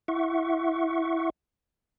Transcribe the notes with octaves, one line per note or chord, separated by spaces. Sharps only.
E4 E5 F#5 C#6